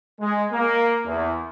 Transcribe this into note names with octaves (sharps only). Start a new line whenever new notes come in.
G#3
A#3
E2